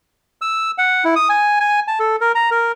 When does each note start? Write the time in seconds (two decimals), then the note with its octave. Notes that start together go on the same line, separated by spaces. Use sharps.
0.42 E6
0.78 F#5
1.04 E4
1.16 D#6
1.29 G#5
1.60 G#5
1.88 A5
2.00 A4
2.21 A#4
2.35 A#5
2.51 A#4